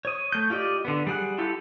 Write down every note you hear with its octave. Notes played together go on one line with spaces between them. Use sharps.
C#5 D#6
A3 G6
F4 G4 D5 D#5
D3 B3
G3 G#4 F#5
E4 F4 G4 A4